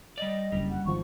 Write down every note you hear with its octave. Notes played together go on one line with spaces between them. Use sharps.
G3 D5 D#5
F#1 G2 G3
F#5
G#1 F3 C#6